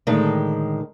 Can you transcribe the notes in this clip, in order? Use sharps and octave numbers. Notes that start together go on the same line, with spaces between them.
A2 D3 D#3 G#3